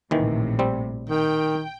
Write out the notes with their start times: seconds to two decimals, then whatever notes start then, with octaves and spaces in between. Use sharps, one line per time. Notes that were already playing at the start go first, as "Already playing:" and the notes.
0.11 A#1 D#2 A2 C3 D#3 E3
0.59 G3 C4
1.09 D#3 G5